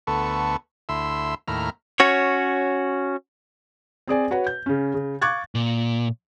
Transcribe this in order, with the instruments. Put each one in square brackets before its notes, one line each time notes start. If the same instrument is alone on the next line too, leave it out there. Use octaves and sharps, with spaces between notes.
[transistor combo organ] D2 B3 A4 C#6
D2 E4 C6 E6
D#2 A2 E4 A#5 F6
[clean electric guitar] C#4 F#4 C#5
[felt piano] C4 G#4 D5 G#5
F#4 B4 C#5 F#5
G6
C#3 C#4
C#3
F5 C#6 D6 F#6 G#6 A6
[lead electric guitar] A#2